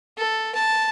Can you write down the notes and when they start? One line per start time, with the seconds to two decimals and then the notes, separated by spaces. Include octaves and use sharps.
0.18 A4
0.54 A5